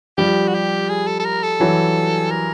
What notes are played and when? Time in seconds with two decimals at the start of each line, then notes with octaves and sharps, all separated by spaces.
0.18 F3 G3 G4
0.48 F#4
0.55 G4
0.89 G#4
1.07 A4
1.20 A4
1.25 A#4
1.43 A4
1.60 E3 F#3
2.31 A#4